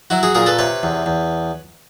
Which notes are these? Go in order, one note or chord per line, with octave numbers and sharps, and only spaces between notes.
F#3 E4 F#4
F#4 G#4
A#2 G#4 A#4
A4 B4
C3 B4 C#5
E2
E2